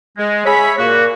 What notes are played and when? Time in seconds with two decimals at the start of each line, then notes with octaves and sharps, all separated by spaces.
0.18 G#3
0.45 G#4 C#5 E5 B5
0.78 A#2 A#3 F#4